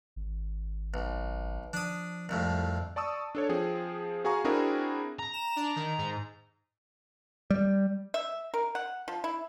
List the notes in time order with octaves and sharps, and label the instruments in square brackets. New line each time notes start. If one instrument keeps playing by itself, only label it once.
[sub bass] G#1
[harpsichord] B1
[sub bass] F3 [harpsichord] D4 D#6
[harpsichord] C2 F2 A2
[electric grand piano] D5 A5 C#6 D#6 E6
D4 A4 C#5
F3 C4 G#4
F#4 G#4 F5 G#5 A#5 C#6
C4 D4 E4 F#4 G#4 A#4
[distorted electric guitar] A#5
[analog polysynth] E7
D4
D#3
G#2
[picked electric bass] G3
[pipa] E5
A#4
F#5
F3
E4